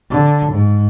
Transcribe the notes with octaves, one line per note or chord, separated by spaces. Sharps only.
D3
G#2